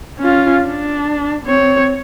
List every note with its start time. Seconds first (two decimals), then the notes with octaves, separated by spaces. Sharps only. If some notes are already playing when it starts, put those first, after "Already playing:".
0.19 C#4 F4
0.66 D4
1.45 C4 C#5